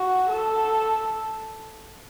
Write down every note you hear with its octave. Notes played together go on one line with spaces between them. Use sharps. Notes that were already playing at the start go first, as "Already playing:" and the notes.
Already playing: F#4
A4